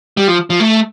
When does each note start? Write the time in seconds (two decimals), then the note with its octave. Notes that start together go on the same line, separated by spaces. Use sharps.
0.17 G3
0.28 F3
0.50 F3
0.60 A3